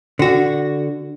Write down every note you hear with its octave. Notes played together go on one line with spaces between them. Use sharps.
D3 F#4